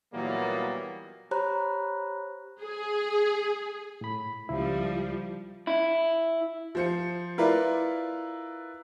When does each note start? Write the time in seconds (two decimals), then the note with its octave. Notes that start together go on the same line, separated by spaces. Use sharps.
0.14 A#2 E3 F#3 G3 A#3 B3
1.31 G4 C5 C#5 A#5 B5 F#6
2.61 G#4
4.01 A2 B5
4.49 C#2 F3 G3 E4
5.67 E4
6.75 F3 C5 C#7
7.38 E4 F4 A#4 B4 D5